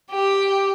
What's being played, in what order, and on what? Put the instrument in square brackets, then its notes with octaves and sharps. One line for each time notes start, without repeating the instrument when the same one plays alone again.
[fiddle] G4